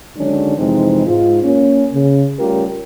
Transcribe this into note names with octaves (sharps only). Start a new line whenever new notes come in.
D3 D#3 F#3 G#3 C#4 D4
F2 C3 E3 G#3 C4 D#4
G#2 F4
A#3 C#4
C#3
G3 A3 C#4 F4 G4 A#4